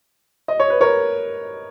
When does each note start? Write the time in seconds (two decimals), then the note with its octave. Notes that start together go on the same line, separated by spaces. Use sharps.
0.48 D#5
0.60 C#5
0.70 B4
0.81 A#4 C#5